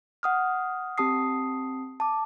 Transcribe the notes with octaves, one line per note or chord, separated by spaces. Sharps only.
F#5 D#6 F6
C4 G4 A5 D#6 C7
A5 D6